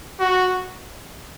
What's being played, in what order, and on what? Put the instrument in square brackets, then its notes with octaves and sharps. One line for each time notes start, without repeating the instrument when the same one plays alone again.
[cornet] F#4